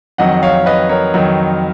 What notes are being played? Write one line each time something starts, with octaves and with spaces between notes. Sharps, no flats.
F2 D#3 F#3 D#5 F#5
C#5 F5
B4 D#5
A#4 C#5
F2 D#3 F#3